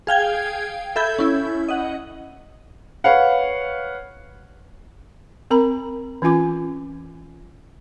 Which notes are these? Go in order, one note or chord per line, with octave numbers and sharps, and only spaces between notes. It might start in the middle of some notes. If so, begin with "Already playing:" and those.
G#4 F5 G5 G#6
A4 E5 B5 G6 G#6
C#4 E4
D#5 F#5
B4 C#5 F5 F#5
C4 A#4 A#5 B5
E3 C#4 F4 G#5 D6